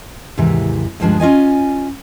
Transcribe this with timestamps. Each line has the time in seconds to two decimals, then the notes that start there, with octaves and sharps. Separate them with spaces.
0.38 D#2 G#2 C3 E3
1.00 D2 G2 F3 G#3 D4
1.20 C#4 F4 D#5 G#5